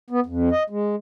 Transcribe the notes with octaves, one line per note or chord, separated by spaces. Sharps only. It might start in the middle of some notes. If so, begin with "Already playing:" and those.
B3
F2
D#5
G#3